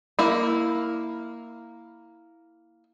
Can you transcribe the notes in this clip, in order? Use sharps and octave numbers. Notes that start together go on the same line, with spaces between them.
A#3 E4